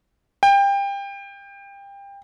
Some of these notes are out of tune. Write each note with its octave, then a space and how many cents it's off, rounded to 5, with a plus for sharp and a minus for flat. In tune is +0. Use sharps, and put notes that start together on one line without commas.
G5 +25